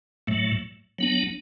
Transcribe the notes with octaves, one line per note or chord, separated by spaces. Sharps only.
A2 F#3 A3
F#3 B3 D4